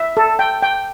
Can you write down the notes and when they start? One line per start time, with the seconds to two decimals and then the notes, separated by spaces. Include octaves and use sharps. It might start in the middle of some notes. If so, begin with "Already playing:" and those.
Already playing: E5
0.17 A4
0.39 G5
0.62 G5